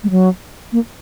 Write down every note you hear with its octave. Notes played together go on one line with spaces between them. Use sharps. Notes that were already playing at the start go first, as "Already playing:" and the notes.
G#3
F#3
A#3